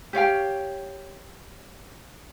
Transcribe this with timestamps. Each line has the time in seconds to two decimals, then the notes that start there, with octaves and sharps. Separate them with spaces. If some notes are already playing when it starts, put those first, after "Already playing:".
0.13 G4 C#5 F5 G5